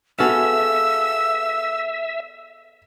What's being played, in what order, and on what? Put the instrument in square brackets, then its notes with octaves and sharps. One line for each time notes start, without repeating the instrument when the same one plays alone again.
[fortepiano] B3 F#4 [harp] G#4 A4 F5 [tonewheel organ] E5 [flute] E6